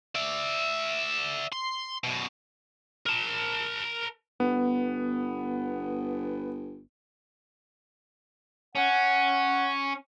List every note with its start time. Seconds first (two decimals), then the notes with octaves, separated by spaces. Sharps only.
0.15 D5 E5
1.52 C6
2.04 F#2 B2
3.06 A#4 A5
4.40 G1 B3
8.75 C#4 F#5